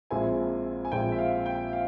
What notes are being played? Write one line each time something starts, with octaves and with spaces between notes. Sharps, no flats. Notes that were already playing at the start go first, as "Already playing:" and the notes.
A#1 A#2 G#3 C4 E4 G#5
G#5
A#1 A#2 G#3 C4 E4 G5
E5
F5
G5
F5